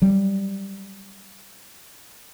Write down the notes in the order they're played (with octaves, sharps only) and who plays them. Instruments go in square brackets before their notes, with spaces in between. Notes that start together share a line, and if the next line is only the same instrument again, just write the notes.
[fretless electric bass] F#3 G3